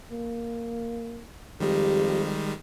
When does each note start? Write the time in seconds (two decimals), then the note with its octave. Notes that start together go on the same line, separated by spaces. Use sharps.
0.12 A#3
1.60 F2 D#3 G3 G#3 G4